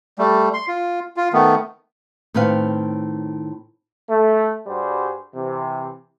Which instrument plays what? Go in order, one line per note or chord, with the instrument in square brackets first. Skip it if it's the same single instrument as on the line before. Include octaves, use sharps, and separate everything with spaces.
[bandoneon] G3 A3
C6
F4
F4
D#3 A3 B3
[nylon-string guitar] A2 D#3 C4 B4 C#5 F5
[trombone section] A3
G2 G3 F#4 G#4 C5
C3 E3